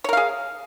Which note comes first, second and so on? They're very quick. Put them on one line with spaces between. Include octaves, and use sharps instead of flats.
C#5 A#4 F5 G#4